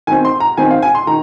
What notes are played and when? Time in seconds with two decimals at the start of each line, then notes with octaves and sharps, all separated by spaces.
0.07 D#3 C4 G#5
0.25 C6
0.40 A#5
0.57 D#3 C4 G#5
0.71 F5
0.83 G#5
0.95 C6
1.07 D#3 A#5